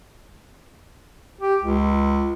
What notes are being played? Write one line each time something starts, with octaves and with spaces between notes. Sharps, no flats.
G4
C#2